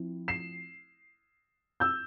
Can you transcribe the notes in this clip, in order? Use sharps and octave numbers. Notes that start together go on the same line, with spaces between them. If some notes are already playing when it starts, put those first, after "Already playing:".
Already playing: F3 C4 E4
C7 E7
E6 G6